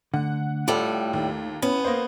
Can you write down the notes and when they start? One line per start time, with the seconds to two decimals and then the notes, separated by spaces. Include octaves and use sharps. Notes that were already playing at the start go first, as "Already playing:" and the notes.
0.14 D3 A3 F#5
0.68 A2 G3 F4 A4
1.13 D#2
1.62 B3 C#4 E4
1.85 A#3 C5 D#6